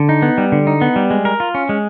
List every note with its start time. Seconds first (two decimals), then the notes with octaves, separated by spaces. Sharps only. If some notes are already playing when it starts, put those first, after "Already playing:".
Already playing: D3
0.09 D#4
0.22 B3
0.38 G3
0.52 D3
0.67 D#4
0.81 B3
0.96 G3
1.10 G#3
1.25 A#4
1.40 F4
1.55 C#4
1.69 G#3